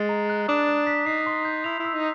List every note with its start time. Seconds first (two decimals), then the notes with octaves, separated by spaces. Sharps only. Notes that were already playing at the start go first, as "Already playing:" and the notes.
Already playing: G#3 A6
0.09 A#5
0.30 F#6
0.48 D4 D#6
0.68 D#6
0.87 B6
1.06 D#4 C7
1.26 C6
1.45 G6
1.64 E4 F7
1.79 E4
1.85 E6
1.94 D#4